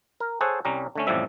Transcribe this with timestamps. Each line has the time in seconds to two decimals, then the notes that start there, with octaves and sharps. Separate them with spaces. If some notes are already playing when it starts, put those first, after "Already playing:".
0.20 A#4
0.41 G#4 A4 C5 C#5 F#5 G#5
0.65 C2 G3 C#4 A#5
0.95 D3 A3 C#4
1.07 A1 F2 A2 F3 G3 E5